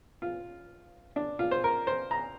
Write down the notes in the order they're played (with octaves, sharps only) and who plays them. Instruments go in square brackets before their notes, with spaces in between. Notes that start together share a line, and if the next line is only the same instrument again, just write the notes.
[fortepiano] F4
D4
F4
C5
A#4
C5
A#5